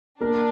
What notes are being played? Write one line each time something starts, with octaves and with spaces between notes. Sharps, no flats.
A#3 D4 A#4